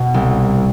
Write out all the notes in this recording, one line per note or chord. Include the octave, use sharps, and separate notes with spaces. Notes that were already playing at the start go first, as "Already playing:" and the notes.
Already playing: B2
C2